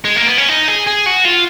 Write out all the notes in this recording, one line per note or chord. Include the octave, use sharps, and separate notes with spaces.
G#3
A#3
B3
C#4
D#4
G#4
G#4
F#4
F4